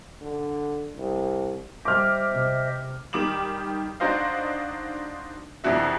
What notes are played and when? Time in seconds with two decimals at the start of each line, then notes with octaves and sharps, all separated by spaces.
0.21 D3
0.96 C2
1.85 G3 C5 D#5 E5 D6 F6
2.30 C3
3.13 D#3 G3 D6 E7 F#7
4.00 D4 D#4 F#4 C5 D#5 F5
5.64 C2 F2 E3 D4 F#4 E5